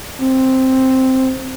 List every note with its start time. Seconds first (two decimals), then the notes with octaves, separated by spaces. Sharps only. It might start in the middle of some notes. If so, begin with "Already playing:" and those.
0.21 C4